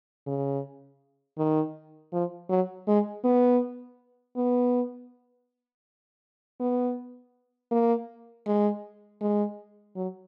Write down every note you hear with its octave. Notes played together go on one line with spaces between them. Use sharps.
C#3
D#3
F3
F#3
G#3
B3
B3
B3
A#3
G#3
G#3
F#3